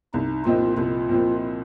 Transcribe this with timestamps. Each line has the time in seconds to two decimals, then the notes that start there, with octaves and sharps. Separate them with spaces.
0.13 C2 D#4
0.45 A#2 F3 C4 D#4 F4
0.77 C2 F4
1.09 A#2 F3 C4